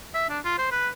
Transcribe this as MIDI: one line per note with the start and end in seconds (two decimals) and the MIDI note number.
0.14 0.28 76
0.29 0.39 62
0.44 0.57 65
0.58 0.69 72
0.71 0.88 71